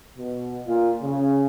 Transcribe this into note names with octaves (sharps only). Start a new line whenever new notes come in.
B2
A#2 F4
C#3